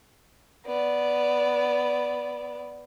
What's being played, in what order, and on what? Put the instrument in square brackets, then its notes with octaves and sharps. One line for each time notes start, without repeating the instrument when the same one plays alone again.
[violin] B3 D5